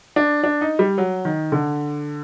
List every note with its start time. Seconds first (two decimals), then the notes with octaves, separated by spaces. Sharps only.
0.16 D4
0.44 D4
0.61 D#4
0.79 G3
0.98 F#3
1.25 D#3
1.52 D3